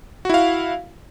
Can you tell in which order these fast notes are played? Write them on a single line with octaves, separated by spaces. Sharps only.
F#4 E4 F5